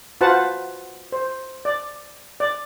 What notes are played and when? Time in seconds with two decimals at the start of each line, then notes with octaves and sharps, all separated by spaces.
0.21 F4 F#4 B4 C5 F#5 A5
1.12 C5
1.65 D5
2.40 D5